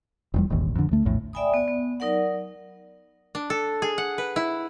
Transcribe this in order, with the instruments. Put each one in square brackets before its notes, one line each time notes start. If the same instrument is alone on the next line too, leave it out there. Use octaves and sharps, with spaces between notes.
[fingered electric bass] F1 E2 G3
E1 A1 D#2
F2 D3
D2 A3
A#1 E2 A2
[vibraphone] D5 E5 G5 G#5 B5 D#6
B3 D5
B3
F#3 D#4 A#4 D5 F#5
[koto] D4
A4
G#4
F#5
B4
E4